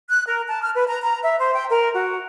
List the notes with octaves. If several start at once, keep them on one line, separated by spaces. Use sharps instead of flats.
F#6
A#4
A5
F6
B4
A#5
A#5
E5
C5
G5
A#4
F#4